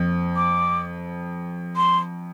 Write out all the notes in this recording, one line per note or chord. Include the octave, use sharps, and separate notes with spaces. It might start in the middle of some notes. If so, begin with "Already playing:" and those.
Already playing: F2
D6
C6